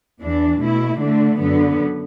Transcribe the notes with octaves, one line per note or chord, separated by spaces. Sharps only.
E2 E3 D4
B2 A3 E4
D3 A3 D4
F#2 D3 B3